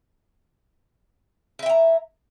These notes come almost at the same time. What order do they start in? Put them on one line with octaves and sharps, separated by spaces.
E4 E5 G5 A#5